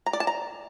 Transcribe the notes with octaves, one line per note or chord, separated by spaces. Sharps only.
A#5
D5
A5
A#5